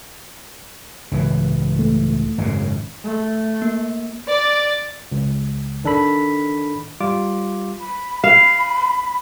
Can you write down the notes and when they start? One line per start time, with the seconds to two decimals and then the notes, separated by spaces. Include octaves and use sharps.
1.12 C#2 A2 E3
1.79 A3
2.38 G#1 F#2 C#3
3.03 A3
3.62 A#3
4.30 D5
5.12 C#2
5.84 D#3 D4 A4 B5 B6
7.00 G3 F4 D6
7.80 B5
8.24 F5 B5